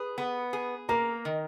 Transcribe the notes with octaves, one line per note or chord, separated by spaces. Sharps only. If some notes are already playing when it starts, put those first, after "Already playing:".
Already playing: G#4 B4
B3
G#4
A#3 A#4 A#5
D#3